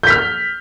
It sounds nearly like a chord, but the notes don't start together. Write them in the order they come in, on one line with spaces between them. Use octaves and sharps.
G6 B6 F6